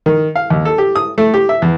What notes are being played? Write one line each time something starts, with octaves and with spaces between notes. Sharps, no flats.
D#3
F5
D#2
A4
G4
D#6
A3
G4
E5
E2